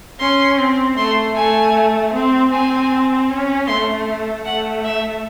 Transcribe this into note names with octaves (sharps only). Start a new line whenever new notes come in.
C#4 C6
C4
A3 C6
A3 G#5
C4
C4 G#5
C#4
A3 C6
A3 F#5
E5